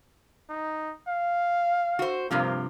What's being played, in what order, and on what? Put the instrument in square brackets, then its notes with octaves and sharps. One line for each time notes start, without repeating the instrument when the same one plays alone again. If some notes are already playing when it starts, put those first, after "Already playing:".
[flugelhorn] D#4
F5
[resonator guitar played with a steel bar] F#4 C5
[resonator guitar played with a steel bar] G2 C3 F3 [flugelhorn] A#3